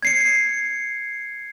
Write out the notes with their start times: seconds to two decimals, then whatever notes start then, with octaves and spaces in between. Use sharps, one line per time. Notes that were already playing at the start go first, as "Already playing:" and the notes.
0.03 G#6 C7 C#7